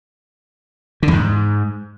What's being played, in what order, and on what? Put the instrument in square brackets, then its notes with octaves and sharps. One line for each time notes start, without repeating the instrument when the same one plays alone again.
[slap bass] D3
E2
G#2